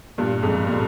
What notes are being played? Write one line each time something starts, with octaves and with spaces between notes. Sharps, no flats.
G2 A#2
F2 G#2
A#2